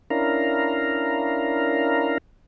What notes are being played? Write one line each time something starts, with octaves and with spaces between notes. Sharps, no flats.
C#4 D4 E4 A#4 F5 A#5